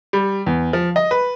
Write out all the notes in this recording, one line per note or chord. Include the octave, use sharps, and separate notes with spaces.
G3
E2
F3
D#5
B4